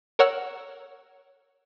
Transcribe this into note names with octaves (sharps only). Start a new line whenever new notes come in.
A#4 C#5 F#5 E6 F6